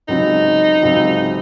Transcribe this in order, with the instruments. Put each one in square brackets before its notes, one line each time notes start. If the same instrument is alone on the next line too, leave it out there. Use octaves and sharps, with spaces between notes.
[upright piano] C#2 C3 F#3 C#4 [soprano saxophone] D#4
[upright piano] C#2 C3 F#3 C#4